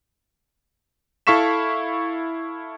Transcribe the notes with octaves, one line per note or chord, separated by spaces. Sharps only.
E4 A4 F5 C#6 B6 E7